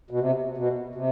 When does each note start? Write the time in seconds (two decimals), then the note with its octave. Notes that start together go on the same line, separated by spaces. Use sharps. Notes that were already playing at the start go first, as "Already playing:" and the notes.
0.11 B2
0.20 C3
0.57 B2
0.95 C3